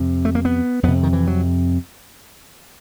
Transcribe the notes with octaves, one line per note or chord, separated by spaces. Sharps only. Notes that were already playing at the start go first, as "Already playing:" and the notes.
Already playing: F2 C3
A3
A#3
B3
F2 C3 B3
D#3
E3
F#3